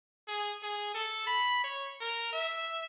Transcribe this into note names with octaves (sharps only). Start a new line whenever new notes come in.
G#4
G#4
A4
B5
C#5
A#4
E5